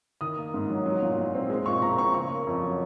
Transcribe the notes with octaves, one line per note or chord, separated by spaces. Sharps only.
D#3 D#6
A#3
G#2
F#3
F#3
A#2
A#2
C4
G#3
A#2 C#6
A#2 A#5
C4 C#6
C#3 C#6
A#3
F2
F#3